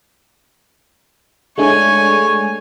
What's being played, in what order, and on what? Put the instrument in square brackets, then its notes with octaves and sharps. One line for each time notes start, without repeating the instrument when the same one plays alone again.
[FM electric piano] G#3 A3 D4 [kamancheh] C#5 G#5